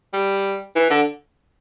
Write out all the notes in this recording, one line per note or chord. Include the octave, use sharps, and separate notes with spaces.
G3
E3
D3